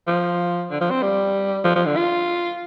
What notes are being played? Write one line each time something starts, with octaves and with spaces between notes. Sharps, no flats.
F3
D3
F3
C4
G3
F3
F3
D3
F4